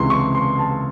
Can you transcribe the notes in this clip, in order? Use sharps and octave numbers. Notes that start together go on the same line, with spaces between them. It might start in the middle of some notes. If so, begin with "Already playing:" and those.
Already playing: C#2 C3 E3 C6
C#6
C6
A5